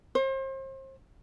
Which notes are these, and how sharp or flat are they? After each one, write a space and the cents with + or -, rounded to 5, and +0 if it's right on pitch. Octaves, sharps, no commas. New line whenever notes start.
C5 +35